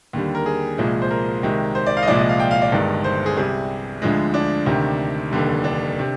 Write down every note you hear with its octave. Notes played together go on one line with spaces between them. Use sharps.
D#2 D3 G3
A#4
G#4
C2 A#2 F3 G#3
C5
A#4
C2 C3 D#3 G#3
C5
D5
F5
D#5
C2 A#2 F3 G#3 D5
D#5
F5
G5
F5
D5
G1 G2 D#3 G#3
C5
G#4
C2 C3 G3 G#4
D2 D3 F3 G#3
D4
D2 C3 D#3
F1 D#2 D3 G3
D4
C3